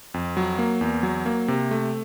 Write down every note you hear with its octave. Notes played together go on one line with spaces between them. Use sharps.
F2
F#3
A#3
E2
F#3
A#3
C3
A3